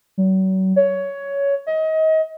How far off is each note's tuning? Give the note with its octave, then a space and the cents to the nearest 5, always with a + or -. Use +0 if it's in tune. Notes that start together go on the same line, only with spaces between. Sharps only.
F#3 +40
C#5 +15
D#5 +30